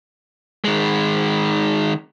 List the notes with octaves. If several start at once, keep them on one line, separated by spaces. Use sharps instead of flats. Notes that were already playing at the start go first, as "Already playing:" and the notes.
D#3 G#3